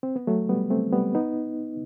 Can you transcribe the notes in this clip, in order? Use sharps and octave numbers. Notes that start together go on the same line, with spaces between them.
C4
B3
F#3 A3
G3 B3
A3 C4
G3 B3
B3 D#4